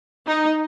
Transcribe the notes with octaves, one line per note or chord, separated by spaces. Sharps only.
D#4